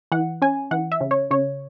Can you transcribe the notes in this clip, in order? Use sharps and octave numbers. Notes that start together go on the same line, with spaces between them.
E3 F#5
C#4 G#5
E3 F#5
E5
C#3
C#5
C#3 C#5